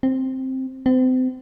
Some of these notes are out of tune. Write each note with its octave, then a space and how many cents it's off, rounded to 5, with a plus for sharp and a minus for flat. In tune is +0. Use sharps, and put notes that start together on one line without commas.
C4 +5
C4 -35